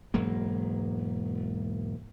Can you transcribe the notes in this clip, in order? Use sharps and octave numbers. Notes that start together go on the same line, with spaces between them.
E1 G#2 F#3 A#3